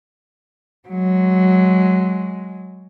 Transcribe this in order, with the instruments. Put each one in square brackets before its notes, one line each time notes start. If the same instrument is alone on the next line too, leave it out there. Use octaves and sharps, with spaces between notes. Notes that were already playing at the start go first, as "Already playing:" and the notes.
[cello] F#3 G#3